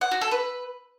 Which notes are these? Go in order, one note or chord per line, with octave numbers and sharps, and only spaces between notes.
F#5
F#4
A4
B4